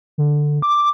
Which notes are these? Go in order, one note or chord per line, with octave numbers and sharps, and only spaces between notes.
D3
D6